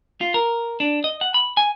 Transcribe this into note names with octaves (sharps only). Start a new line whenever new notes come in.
F4
A#4
D4
D#5
F#5
B5
G#5